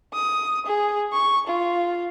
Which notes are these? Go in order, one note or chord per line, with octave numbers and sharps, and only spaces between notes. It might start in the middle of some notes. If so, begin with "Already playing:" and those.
D#6
G#4
C#6
F4